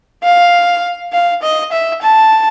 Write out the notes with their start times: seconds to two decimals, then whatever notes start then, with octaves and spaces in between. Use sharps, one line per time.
0.23 F5
1.13 F5
1.42 D#5
1.72 E5
2.02 A5